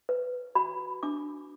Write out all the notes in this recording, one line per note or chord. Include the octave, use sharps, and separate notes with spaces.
B4
F#4 B5
D4 D6